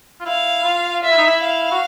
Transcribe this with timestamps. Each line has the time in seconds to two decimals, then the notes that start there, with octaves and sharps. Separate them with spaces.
0.20 F4
0.26 E4 F5
0.64 F4
1.03 F4 E5
1.11 E4
1.18 D#4
1.27 E4
1.42 F5
1.71 F#4